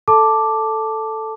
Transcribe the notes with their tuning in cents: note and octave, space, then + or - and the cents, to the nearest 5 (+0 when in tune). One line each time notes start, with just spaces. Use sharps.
A4 +0 A5 +0 D6 +0